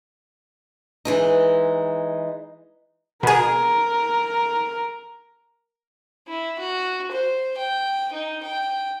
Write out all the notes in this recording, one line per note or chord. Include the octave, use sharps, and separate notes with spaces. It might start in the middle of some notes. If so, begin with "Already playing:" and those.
E3 G#3 D#4
B2 G#4 A#4
E4
F#4
C5
G5
D#4
G5